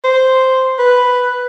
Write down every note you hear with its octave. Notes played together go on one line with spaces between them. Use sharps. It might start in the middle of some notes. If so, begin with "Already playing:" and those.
C5
B4